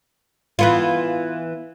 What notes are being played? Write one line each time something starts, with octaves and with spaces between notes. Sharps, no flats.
E3 B3 F4